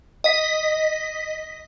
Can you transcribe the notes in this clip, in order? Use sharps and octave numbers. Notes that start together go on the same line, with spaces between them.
D#5 B6